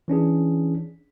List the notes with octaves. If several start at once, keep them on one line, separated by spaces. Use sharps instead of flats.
E3 C#4 D4 G#4